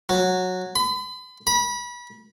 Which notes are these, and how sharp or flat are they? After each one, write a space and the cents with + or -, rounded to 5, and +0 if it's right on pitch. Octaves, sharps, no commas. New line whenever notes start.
F#3 -10
B5 +40
B5 -30